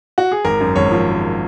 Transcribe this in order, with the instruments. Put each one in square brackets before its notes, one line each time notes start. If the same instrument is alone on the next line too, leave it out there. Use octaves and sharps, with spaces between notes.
[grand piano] F#4
G#4
G#1 A#4
F#2
G#1 C#5
F3